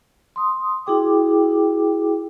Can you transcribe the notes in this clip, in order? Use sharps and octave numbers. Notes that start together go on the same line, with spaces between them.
C6 D#6
E4 F#4 G#4 G5 D6